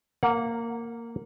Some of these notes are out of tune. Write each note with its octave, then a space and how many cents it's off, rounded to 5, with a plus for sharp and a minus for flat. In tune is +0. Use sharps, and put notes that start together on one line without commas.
A#3 -10 F#5 -30